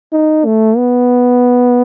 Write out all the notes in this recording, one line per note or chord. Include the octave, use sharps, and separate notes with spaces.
D#4
A3
B3